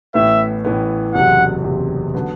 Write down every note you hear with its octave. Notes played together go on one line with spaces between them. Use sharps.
A1 A2 E3 B3 E5
A1 A2 E3 B3
F#1 E2 C3 F#3 F#5
F#1 E2 C3 F#3
D3 F#3 B3